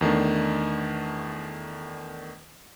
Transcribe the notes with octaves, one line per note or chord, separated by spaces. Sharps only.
E2 D#3 A3 D4